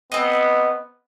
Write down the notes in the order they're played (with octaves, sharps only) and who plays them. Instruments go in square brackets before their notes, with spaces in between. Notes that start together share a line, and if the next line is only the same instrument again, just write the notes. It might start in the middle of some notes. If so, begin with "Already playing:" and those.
[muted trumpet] B3 [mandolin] C4 D#5